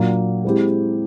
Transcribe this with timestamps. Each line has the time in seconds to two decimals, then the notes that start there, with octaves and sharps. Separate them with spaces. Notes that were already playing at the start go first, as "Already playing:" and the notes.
Already playing: A#2 F#3 A#3 D4
0.45 G#3 C4 E4 G4